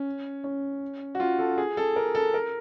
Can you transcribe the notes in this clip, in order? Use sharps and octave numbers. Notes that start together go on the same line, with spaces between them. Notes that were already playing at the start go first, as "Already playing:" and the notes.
Already playing: C#4
C#4
F#4
F4
A4
G#4
A4
A#4
A4
A#4